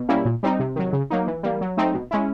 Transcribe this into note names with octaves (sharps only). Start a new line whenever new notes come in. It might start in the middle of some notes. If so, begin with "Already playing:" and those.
Already playing: B2
G3 A#3 C#4 E4
A#2
G3 C4 D#4
C3
D#3 F#3
C#3
F#3 A#3 D#4
E3
G3 A#3
F#3
A3 C4 D#4
B2
G#3 C#4 E4